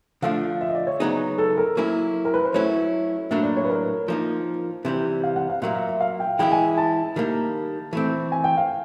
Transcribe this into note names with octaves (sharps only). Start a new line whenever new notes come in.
D3 F3 A3 D4 F5
E5
D#5
D5
C#5
C#3 F#3 B3 D#4 G#4
A4
A#4
F#3 A#3 C#4 E4
A#4
B4
C5
F#3 A3 C#4 E4 C#5
A2 F#3 A#3 D4 E5
D5
C#5
B4
A#4
F3 A#3 D#4
C3 E3 G3
F5
F#5
F5
A#2 F#3 A#3 E5
E5
E5
F5
G5
E3 G#3 C#4 E4 G5
G#5
A5
D#3 G3 A#3
E3 A3 C4
G#5
G5
F5